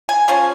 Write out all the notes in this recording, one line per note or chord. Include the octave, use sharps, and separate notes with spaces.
G#5
F3 G#3 C#4